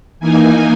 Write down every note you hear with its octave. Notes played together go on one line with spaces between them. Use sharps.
E3 A#3 D#4 G#5